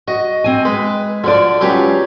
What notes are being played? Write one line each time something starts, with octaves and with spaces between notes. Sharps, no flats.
F#4 D#5
C4 G#5
G#3 B4
D3 F3 F#4 D5
F#3 G#3 C#4 F4 G4 B4